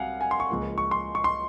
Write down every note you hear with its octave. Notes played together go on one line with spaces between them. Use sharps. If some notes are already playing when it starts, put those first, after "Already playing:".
Already playing: C2 C3 F#3 F5 F#5 G#5
G#5
C6
C#6
C#2 C#3 F3 A#3
C#6
C6
C#6
C6